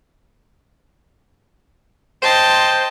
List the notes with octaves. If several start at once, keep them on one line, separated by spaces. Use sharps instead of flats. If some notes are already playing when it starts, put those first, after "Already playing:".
C5 D#5 G5 A5